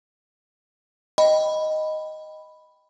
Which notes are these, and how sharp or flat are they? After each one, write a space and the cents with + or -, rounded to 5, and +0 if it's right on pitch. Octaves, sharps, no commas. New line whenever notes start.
D#5 +0 G5 +0 B5 +0